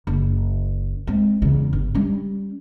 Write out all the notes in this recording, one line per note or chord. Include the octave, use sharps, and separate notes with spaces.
F#1
G#3 C4
E2 C#3
G1
G3 C#4